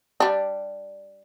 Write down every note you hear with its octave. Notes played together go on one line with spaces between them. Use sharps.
G3 D4